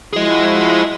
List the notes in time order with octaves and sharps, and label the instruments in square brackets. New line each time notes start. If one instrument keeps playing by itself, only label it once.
[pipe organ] F3 E4 F#4 [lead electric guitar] G#4 D#5